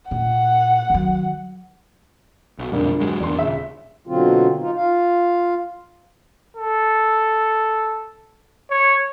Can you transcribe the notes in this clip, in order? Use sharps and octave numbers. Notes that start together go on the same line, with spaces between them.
A#2 F#5
D#3 F#3
B1
B1 F2 G#2 D3 G3 A#3
G#2 F#3 G#3
E2 A#3 D4 C6
D#1 C#3 E5
B2 D3 F#3 C4 F4
D#4 F4
F4 F5
A4
C#5